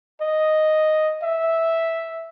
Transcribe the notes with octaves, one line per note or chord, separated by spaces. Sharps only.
D#5
E5